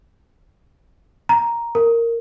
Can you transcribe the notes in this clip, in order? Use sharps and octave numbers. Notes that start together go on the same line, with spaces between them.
A#5
A#4